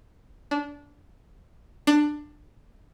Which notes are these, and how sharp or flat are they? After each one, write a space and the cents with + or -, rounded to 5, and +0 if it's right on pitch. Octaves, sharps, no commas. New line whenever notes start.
D4 -20
D4 +15